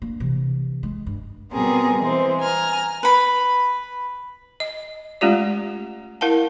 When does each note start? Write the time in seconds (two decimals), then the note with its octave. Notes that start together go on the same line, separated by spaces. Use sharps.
0.02 A#3 D4
0.20 C3 E3
0.83 G#3
1.06 G2
1.52 B2 G3 B3 C4 G#4 A#4
1.99 E3 G#3 C4
2.40 G#5 A#5 F6
3.03 B4 B5
4.60 D#5
5.21 G#3 A3 C#4 F4 G4 D5
6.21 E4 A#4 F5 F#5 A5